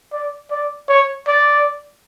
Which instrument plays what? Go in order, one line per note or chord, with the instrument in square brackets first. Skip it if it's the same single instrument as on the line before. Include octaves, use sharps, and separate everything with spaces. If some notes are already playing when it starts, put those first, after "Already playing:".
[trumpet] D5
D5
C#5
D5